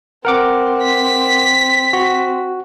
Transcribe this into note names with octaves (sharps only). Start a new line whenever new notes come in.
C4 A#4 F#5 D6
B6
F#4